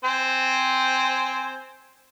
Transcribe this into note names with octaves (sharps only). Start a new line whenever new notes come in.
C4 C5 G#5